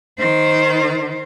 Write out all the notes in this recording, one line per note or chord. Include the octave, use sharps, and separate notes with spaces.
D#3 C5